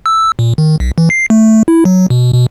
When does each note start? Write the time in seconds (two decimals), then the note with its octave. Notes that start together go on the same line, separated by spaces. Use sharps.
0.06 E6
0.39 A#2
0.58 D#3
0.80 B1
0.98 E3
1.10 C7
1.30 A3
1.68 E4
1.85 F#3
2.10 B2
2.33 B2